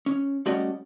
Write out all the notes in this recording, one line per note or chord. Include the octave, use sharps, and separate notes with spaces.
C#4
G3 A3 C#4 F#4 D5 D#5